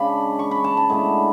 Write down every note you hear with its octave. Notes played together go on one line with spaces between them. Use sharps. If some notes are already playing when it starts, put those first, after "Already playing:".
Already playing: C#3 G#3 D4 B5
C#6
B5
A5
A5
A2 G#3 B3 D4